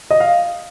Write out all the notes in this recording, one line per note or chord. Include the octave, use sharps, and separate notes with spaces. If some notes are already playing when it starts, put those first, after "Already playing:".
D#5
F5